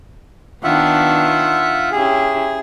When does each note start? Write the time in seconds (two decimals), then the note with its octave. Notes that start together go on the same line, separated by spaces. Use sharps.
0.64 D#3 B3 D4 F4 E5 F#5
1.92 C#4 E4 G4 G#4